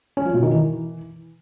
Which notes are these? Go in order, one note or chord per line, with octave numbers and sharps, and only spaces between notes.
C#4
F3
B2
D#3
E3